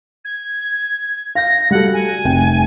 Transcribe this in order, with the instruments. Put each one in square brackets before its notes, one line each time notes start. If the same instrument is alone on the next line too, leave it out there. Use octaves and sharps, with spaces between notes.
[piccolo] G#6
[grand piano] F5 G6 [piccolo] A#6
[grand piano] G3 F#4 A4 [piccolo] F#5
[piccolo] G#5
[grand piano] F1 C3 G5